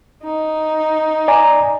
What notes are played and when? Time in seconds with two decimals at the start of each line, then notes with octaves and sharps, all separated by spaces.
0.23 D#4
1.28 D5 G#5 A#5